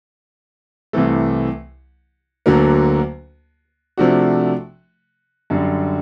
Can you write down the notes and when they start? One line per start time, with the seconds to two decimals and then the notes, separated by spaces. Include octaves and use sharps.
0.93 C2 C3 E3 A3
2.46 D2 D3 F#3 A#3
3.98 C3 F3 A3 D4 F#4
5.50 F#2 D3 G3